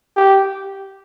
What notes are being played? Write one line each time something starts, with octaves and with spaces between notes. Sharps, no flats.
G4